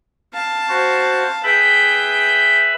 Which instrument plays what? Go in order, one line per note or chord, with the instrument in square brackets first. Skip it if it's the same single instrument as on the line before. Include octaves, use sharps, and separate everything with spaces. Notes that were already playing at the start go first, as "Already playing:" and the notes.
[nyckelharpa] F5 A5
[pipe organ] F#4 C5
[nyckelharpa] G#4 G5 [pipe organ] B4 E5 B5